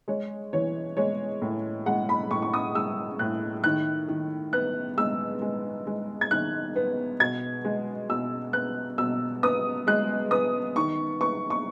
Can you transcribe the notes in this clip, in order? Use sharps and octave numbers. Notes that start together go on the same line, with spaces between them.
G#3 C#5
E3 C#5
G#3 C#5
A2
G#3 F#5
B5
A2 C#6
C#6
D#6
G#3 E6
A2 F#6
D#3 F#6
D#3
B3 F#6
G#3 E6
G#3
G#3
G#6
D#3 F#6
B3
B2 G#6
G#3
B2 E6
B3 F#6
B2 E6
B3 D#6
G#3 F#6
B3 D#6
D#3 C#6
B3 C#6
C#6